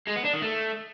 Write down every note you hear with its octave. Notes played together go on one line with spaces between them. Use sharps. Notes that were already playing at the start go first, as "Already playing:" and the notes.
G#3
B3
D4
D#3
A3